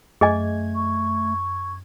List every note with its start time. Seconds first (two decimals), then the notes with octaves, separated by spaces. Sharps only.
0.21 F#2 A3 G#4 D#5 G#5 G#6
0.75 C#6